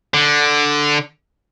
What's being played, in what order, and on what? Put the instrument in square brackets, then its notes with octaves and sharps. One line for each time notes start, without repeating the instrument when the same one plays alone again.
[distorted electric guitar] D3